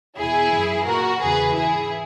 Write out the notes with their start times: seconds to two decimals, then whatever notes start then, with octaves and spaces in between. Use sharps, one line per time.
0.18 E2 B2 E4 G#4
0.52 F#2 E3
0.86 A#2 F#4 A#4
1.21 E2 C#3 E3 G#4 B4
1.55 G#2 E3 E4 G#4